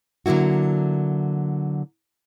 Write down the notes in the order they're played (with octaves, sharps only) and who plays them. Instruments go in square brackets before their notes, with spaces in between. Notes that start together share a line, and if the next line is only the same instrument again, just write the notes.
[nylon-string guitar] D3 F#3 A#3 E4 F#4